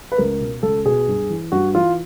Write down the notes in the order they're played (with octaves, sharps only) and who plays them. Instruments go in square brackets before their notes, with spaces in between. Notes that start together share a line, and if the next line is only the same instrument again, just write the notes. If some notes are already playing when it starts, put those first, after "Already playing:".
[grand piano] B4
C#2 A#4
B2
C#2 A4
B2 G#4
G2
E3
G2 F#4
E3 F4